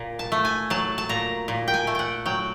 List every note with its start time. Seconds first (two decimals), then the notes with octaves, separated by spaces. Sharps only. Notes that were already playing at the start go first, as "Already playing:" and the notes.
Already playing: A#2
0.19 A5
0.32 A3
0.45 G#5
0.70 F#3 A5
0.98 A5
1.09 A#2 A#5
1.48 A#2
1.68 G5
1.74 G#5
1.87 A3
1.95 F#5 G5
2.26 F#3 G5